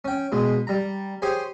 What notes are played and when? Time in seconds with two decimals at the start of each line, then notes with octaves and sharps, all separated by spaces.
0.05 C#4 G5
0.32 B2 G#3
0.67 G3 A#5
1.22 G4 G#4 C5 C#5 G#5